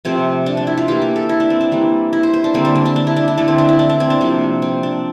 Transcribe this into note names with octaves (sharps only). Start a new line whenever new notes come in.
C3 F3 A3 C4
D4
D4
E4
F4
E3 A#3 G4
A#4
A4
E4
D4
C4
D4
E3 G3 A#3
E4
C5
C5
D4
D3 G3 A#3 C4
D4
D4
D4
D4
E4
D4
E4
D3 A3 D4
C4
D4
E4
D4
D4
C4
D4
C3 F3 A#3
C4
D4